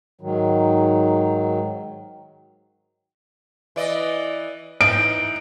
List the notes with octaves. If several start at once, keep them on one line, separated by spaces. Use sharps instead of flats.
G#2 D#3 F#3
E3 D5 D#5
E3 D#4 D7